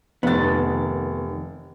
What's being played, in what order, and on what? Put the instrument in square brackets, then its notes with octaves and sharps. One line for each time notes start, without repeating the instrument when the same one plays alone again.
[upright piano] F1 A6 [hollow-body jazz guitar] D#3 B3